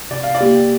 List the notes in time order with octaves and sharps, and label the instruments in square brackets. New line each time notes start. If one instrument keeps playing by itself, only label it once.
[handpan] C3 [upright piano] D5
[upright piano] F5
D5
[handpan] A#3 G4